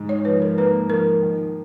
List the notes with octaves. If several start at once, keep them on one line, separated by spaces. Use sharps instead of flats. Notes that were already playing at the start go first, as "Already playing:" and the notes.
Already playing: G#2
C#5
F3 B4
A#4
A#3 B4
F3 A#4
D#3